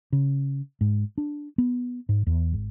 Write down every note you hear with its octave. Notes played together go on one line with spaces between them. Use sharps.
C#3
G#2
D4
B3
G#2
E2
G#1